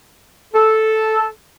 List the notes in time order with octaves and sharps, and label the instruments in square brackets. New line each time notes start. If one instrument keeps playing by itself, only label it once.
[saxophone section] A4